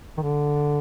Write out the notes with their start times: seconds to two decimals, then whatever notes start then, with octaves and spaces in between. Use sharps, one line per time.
0.18 D#3
0.22 D3